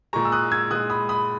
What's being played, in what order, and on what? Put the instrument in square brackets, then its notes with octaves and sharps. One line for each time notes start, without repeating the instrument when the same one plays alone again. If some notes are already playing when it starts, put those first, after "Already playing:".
[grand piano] A#2 G#3 A#5 C#6
E6
D#6 F#6
E6 G#6
A#2 G#3 D#6 F#6
B5 D#6
B5 D#6